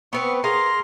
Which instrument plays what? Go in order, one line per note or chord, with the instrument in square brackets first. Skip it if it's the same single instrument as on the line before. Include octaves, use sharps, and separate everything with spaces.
[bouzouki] B3 C4 B4 [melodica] C#6
[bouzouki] G#4 A#4 F5 [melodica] A#5 C6